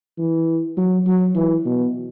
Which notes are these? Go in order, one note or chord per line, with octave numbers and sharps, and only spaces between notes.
E3
F#3
F#3
E3
B2